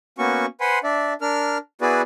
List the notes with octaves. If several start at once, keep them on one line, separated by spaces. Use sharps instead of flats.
A#3 B3 C#4 F#4 C#6
B4 C5 F#5 G#5 B5 C6
D4 D5 E5
D4 A#4 F6
B3 E4 F#4 G#4 B4 D5